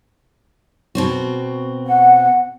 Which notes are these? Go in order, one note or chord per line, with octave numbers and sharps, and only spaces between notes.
B2 C4 F#4
F#5